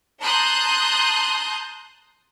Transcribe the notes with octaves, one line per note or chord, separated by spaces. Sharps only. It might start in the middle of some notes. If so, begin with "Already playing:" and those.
A5 A#5 C6 D#6 F#6 G6